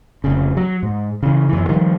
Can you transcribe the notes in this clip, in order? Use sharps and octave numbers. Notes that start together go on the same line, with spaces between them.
F1 C#3
F#3
G#2
C#3 E3
F#2 E3
D#3 F3 G3